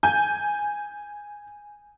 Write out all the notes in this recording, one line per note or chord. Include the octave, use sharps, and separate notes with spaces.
G#5 G6